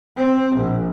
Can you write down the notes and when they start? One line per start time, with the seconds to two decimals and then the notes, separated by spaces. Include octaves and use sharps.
0.17 C4
0.56 A#1